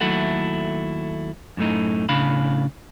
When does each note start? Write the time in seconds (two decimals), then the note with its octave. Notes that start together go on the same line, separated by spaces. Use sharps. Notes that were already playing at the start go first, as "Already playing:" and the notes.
0.01 D#2 F#3 A3 E4 A4 F#5
1.57 F#2 A2 A3 D#4
2.09 A2 C#3 D4 F5 B5